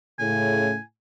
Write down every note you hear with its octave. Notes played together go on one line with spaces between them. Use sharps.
A2 C#3 G#5